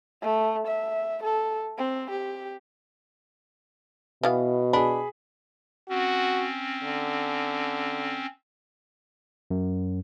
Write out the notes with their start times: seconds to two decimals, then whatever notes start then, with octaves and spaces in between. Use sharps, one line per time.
0.22 A3
0.67 E5
1.23 A4
1.78 C4
2.10 G4
4.23 B2 E3 B3 F5
4.73 D4 G#4 B5
5.89 C4 C#4 F#4
6.84 D3
9.51 F#2